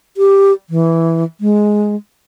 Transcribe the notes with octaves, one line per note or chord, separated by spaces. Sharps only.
G4
E3
G#3